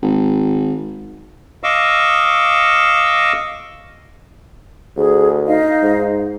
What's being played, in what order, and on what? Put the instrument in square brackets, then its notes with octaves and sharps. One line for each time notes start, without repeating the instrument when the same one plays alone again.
[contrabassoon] G#1
[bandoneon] D#5 F5 C#6 D6 E6
[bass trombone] D2 [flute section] G#4
[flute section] D#4 D#5 F5
[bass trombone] G#2